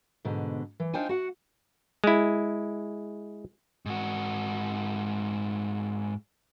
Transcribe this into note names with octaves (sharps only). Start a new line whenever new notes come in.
G#2 B2 D3
E3
D4 D#4 F4 C5 G5 G#5
F#4 F#5
G#3 E4
G#2 F#4